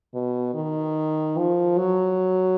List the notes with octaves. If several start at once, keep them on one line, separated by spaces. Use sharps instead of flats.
B2
D#3
F3
F#3